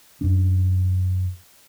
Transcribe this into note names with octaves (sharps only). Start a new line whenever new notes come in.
F#2 D4